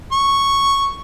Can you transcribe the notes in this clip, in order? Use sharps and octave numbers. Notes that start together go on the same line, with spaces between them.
C#6